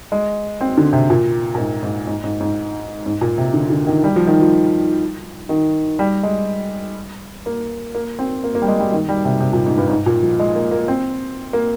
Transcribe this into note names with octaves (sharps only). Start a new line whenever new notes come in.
G#3
C4
D3
C3
A#2
A#2
G#2
G#2
G#2
G#2
G#2
G#2
A#2
C3
D3
D3
D#3
G3
F3
D#3
F3
D#3
G3
G#3
A#3
A#3
C4
A#3
A#3
G3
G#3
G3
D#3
G3
C3
C3
A#2
G#2
G2
G#2
A#2
F3
G#3
A#3
A#3
C4
A#3